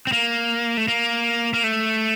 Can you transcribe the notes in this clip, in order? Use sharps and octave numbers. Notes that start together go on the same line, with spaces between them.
C4
A#3
A3
A#3
A#3
A3